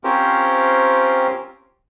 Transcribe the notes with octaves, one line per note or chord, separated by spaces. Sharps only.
C4 C#4 F4 G4 A#4 C5